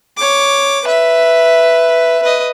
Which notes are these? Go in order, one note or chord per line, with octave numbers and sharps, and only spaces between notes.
C#5 D6
B4 E5
B4 D#5